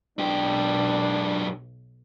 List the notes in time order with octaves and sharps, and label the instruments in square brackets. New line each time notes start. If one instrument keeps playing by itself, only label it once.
[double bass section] B1 [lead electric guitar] F#2 G4 [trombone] D4